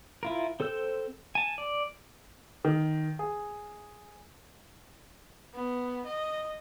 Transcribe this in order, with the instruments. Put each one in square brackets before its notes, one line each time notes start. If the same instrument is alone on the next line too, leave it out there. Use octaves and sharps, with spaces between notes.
[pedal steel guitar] E4 F4 A#4
C4 A4 C5 E6 G6
G#5 A5
D5
[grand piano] D#3
G#4
[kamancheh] B3
D#5